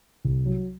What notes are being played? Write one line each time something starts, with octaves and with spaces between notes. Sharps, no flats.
C2
F#3